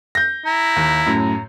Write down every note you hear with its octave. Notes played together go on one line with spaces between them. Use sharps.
G6 A#6
E4 A#5
D#2
F#2 A2